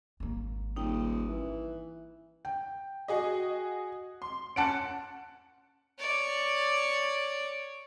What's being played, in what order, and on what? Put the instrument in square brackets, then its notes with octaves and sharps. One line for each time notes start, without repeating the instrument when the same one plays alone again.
[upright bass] G#1 A#3
[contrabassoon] D#1 [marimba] D#4 G5
[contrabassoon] E3
[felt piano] G5
[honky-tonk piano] F#4 G#4 D#5
C6
[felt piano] C#4 F#5 A5 [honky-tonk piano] F#6 C#7 D7
[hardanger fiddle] C#5 D5